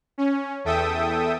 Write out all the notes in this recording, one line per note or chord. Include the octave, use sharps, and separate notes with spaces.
C#4
E2 A4 E5 G5 D#6